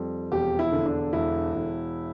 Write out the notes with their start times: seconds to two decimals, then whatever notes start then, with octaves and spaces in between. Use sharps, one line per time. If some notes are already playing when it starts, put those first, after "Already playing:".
Already playing: F2 G3
0.31 E1 G4
0.59 E4
0.72 D3
0.86 D4
1.13 E1 E4
1.54 E1